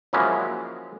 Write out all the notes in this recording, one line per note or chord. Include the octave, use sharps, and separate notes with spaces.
F3 F#3 G#3 A#3 C#4 E4